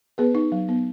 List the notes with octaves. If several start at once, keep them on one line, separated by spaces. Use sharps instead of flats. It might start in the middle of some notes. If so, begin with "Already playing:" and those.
B3 G#4 B4
D#4
F#3
B3